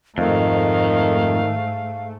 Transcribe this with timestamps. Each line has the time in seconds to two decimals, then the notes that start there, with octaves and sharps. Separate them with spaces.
0.18 F2 G#2 D#3 A3 F5